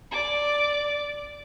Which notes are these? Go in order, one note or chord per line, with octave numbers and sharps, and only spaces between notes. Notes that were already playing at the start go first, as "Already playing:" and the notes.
D5 D6